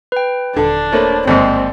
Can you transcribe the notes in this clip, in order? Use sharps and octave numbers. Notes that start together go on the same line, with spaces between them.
B4 G5
D#1 D3 D4
A3 A#3 C5 C#5 B5
G1 D#2 G#2 C4 D5